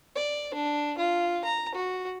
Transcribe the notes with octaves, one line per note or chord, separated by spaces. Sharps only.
D5
D4
F4
A#5
F#4